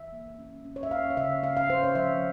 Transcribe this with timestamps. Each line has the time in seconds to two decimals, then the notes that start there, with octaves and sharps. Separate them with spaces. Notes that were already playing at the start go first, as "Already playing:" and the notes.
Already playing: E3 E5
0.12 A#3
0.39 C#4
0.65 C#4
0.76 C#5
0.83 E5
0.91 C#4 F5
1.10 C#5
1.17 C#3 E5
1.43 C#4 F5
1.57 F5
1.69 C#4 C5
1.83 C#5
1.95 F3 E5